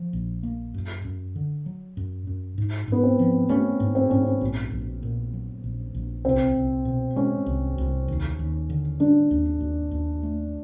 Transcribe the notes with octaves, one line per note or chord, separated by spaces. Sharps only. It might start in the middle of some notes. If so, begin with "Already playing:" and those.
Already playing: F3
A#1
A#3
F#2
F#2
D3
F#3
F#2
F#2
G#2
G#2 B3
C4
F3
A3 C#4
G#2
C4
G#2 C#4
C4
A#1
A#1
A#2
F#3
A#1
A#1
C2 C4
C2
B2
G#3 C#4
C2
C2
D#2
D#2
D3
G3 D4
D#2
D#2
D#2
A3